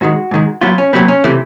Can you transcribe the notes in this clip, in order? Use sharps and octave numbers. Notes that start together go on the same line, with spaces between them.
G#2 D#3 G#3 F#4
G#2 D#3 G#3
A#2 F#3 B3 F4
C#4
A#2 F#3 B3 C4
C#4
C3 E3 A3